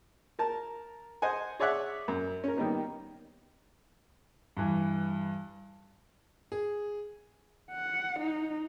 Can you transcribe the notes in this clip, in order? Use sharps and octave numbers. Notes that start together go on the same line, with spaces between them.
A#4 A5
C5 D#5 F#5 G#5
G#4 C#5 D5 E5 F#5 F#6
F#2
C#4 A#4
D#3 G3 A#3 B3 D#4
G2 E3
G#4
F#5
D#4